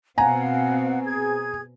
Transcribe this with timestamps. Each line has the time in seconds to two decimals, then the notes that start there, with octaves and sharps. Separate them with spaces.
0.18 B2 C4 F5 F#5 G#5 A#5
1.04 G#4 G#6